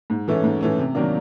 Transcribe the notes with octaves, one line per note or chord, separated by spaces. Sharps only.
G#2
E3 A3 C#4
G#2
E3 A3 C#4
C3
D#3 F#3 A#3 D4